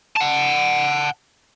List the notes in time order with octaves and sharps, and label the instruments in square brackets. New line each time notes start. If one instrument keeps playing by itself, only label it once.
[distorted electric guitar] F#5 A5